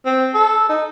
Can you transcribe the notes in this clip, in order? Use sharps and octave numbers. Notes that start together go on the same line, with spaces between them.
C4
A4
D#4